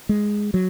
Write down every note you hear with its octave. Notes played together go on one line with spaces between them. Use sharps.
G#3
F#3